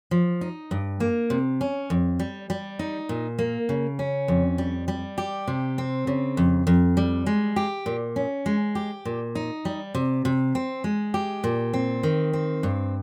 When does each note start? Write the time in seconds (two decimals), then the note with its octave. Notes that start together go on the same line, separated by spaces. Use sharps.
0.11 F3
0.41 D#4
0.71 G2
1.00 A#3
1.30 C3
1.61 C#4
1.90 F2
2.19 G3
2.50 G3
2.79 D#4
3.09 A#2
3.39 A#3
3.69 C#3
3.99 C#4
4.28 F2
4.58 G3
4.88 G3
5.18 G4
5.47 C3
5.78 C4
6.07 C#3
6.37 F2
6.67 F2
6.97 G3
7.26 G#3
7.56 G4
7.86 A#2
8.16 C#4
8.46 G#3
8.75 G4
9.05 A#2
9.35 D#4
9.65 G3
9.95 C3
10.25 C3
10.55 C4
10.84 G#3
11.14 G4
11.44 A#2
11.73 C4
12.03 D#3
12.33 C4
12.63 G2